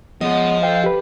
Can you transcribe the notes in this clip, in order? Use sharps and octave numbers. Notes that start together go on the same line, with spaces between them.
C#3 F3 G#3 B3 D#5
F4 A4 C5 F5 G5
G4 B4